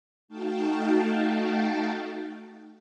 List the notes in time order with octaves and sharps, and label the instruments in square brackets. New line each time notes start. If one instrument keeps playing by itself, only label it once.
[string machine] A3 D#4 F#4 F5 G5 A5